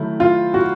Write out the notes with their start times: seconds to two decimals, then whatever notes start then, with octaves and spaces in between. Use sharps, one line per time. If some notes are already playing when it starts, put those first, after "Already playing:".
Already playing: D#3 F#3 A3 E4
0.20 F4
0.54 F#4